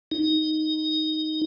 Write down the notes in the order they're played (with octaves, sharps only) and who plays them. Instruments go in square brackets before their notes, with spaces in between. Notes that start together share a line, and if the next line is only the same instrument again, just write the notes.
[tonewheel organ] D#4